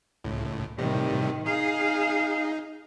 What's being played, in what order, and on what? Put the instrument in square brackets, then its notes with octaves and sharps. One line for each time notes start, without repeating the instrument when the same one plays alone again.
[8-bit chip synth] C#2 A2
[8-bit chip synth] A2 C3 G3 [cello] D#3
[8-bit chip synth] D#4 [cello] G#4 F5